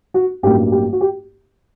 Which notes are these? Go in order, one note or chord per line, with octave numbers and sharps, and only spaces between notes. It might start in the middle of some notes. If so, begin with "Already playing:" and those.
F#4
A1 G2 F#3 A#3 G4
G4
F#4
G4